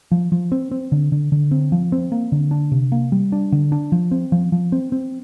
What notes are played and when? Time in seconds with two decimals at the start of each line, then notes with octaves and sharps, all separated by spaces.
0.12 F3
0.32 F3
0.52 C4
0.71 C4
0.92 D3
1.12 D3
1.32 D3
1.51 C4
1.72 F3
1.92 C4
2.12 A#3
2.32 D3
2.51 D4
2.72 C3
2.92 A#3
3.12 G3
3.32 D4
3.52 D3
3.72 D4
3.92 F3
4.11 C4
4.32 F3
4.52 F3
4.72 C4
4.92 C4